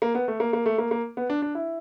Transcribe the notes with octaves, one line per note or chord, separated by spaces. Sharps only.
A#3
B3
A3
A#3
A#3
A3
A#3
A#3
B3
D4
D4
E4